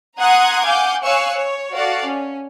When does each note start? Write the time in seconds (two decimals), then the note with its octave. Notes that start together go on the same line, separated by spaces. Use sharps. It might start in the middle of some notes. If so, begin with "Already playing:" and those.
0.18 F#5 A#5 C6 D#6 F#6 G#6
0.64 F5 F#5 G#5 D6 G6
1.02 C#5 F5 G#5 C#6 E6 F#6
1.34 C#5
1.73 F#4 A4 D5 F5 F#5
2.04 C#4